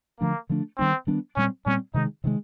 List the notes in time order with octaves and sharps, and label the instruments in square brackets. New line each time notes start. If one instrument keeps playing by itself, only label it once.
[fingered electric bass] D3 F3 A3 D4 [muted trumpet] A#3
[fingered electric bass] D3 F3 A3 D4
[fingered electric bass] D#3 G3 B3 D4 [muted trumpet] C4
[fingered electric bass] D#3 G3 B3 D4
[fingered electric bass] A#2 G3 C4 [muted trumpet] C#4
[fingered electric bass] A#2 G3 C4 [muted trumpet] C#4
[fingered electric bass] C3 D#3 G#3 [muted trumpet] D#4
[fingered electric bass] C3 D#3 G#3